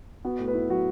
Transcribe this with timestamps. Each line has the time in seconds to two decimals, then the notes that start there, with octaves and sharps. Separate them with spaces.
0.25 B3 F#4
0.39 A2
0.48 B4
0.54 E4
0.70 F#3 F#4